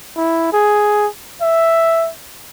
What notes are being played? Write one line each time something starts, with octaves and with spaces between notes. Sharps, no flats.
E4
G#4
E5